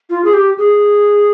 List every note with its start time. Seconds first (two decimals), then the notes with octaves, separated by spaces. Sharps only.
0.10 F4
0.24 G#4
0.33 G4
0.58 G#4